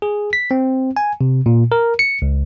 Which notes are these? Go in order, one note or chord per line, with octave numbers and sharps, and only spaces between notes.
G#4
B6
C4
G#5
C3
A#2
A#4
C#7
C#2